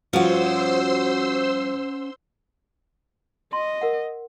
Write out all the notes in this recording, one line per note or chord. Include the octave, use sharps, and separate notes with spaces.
G2 F3 C#4 F#4 C5 F#5 C6 E6
D#5 C6
A#4 F#5